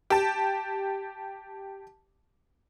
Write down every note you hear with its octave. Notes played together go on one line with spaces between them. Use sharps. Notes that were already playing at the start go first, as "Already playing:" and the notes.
G4 A5